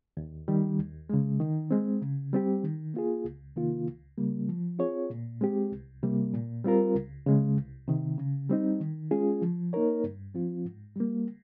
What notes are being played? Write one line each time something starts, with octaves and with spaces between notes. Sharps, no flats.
D#2
D#3 G3
D#2
C#3 G#3
D#3
G#3 C4
C#3
G3 C4 G4
D#3
A#3 F4 G#4
C#2
C3 D#3 A#3 F4
C#2
C#3 G3 A#3
F3
C4 F4 G#4 C#5
A#2
G#3 C4 G4
C2
C3 G3 A#3
A#2
G3 C4 F4 A#4
C#2
C#3 G#3
C2
C3 D#3
C#3
G3 C4 D#4
D#3
G#3 C#4 F4 G#4
F3
A#3 D#4 A#4 C#5
G2
F3 C4 F4
G#2
G3 A#3